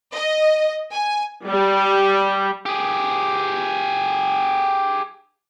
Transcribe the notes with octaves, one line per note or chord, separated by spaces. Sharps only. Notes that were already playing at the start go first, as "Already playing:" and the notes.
D#5
G#5
G3
G4 G#4